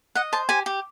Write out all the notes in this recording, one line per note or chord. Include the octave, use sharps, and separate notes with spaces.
D#5 F#5
C5 A5
G4 G#5
G4